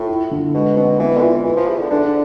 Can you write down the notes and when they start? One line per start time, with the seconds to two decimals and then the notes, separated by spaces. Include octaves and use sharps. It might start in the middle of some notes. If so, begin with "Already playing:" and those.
Already playing: A2 F4
0.08 E4
0.31 D3
0.54 B2 G#3
0.76 B2 C4
0.99 E3 B3
1.16 D3
1.22 E3 F4
1.45 E3 F4
1.56 F3
1.67 E3 G#4
1.79 D3
1.90 D3 D4